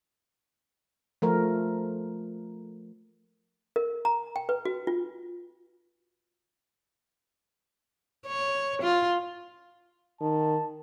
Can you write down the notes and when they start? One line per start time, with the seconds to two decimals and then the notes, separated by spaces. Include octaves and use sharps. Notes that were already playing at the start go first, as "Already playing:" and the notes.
1.22 F3 A3 A#4
3.76 A#4
4.05 A#5
4.36 G5
4.49 B4
4.65 F#4
4.87 F4
8.27 C#5
8.82 F4
10.21 D#3 A5